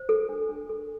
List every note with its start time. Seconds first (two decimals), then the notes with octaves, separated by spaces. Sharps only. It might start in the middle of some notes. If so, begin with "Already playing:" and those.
Already playing: C5
0.09 A4
0.29 D4
0.49 D4
0.69 A4